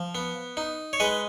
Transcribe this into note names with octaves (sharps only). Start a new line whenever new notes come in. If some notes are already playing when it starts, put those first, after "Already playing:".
Already playing: F3
B3
D#4
C#5
G#3 B4 D#5